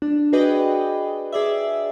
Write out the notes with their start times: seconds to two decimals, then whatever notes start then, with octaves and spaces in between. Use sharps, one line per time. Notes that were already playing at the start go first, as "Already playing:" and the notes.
0.02 D4
0.33 F#4 G#4 B4 D5 D#5 G5
1.32 G#4 D5 E5